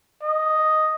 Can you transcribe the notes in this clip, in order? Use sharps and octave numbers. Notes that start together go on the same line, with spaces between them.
D#5